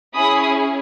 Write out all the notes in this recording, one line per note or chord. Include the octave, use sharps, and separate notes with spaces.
C#4 E4 G#4 B5 D#6